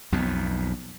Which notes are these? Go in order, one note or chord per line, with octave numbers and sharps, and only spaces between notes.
B1 F2 B2